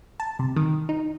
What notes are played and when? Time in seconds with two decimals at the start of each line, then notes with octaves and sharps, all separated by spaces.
0.20 A5
0.39 C3
0.56 D#3
0.89 D#4